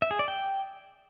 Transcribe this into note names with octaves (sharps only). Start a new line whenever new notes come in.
E5
G#4
D5
G5